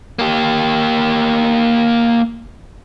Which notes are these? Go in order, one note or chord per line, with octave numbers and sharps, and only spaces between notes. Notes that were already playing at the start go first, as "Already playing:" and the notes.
A#3 G4